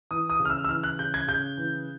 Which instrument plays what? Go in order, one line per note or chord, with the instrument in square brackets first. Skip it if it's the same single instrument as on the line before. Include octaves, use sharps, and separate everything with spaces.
[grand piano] E3 D#6
D#6
C#3
F6
E6
E6
E3 F6
F#6
C#3 G6
G#6
C#3 G6
E3